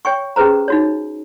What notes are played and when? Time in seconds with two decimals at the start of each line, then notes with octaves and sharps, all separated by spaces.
0.05 C#5 G5 G#5 C#6
0.36 C#4 G4 G#4 B4 C5 A#5
0.68 D#4 F#4 C#5